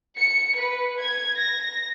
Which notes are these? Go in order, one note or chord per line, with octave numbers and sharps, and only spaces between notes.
C#7
B4
G#6
A#6